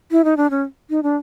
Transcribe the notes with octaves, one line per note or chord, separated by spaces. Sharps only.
E4
D#4
D4
C#4
D#4
D4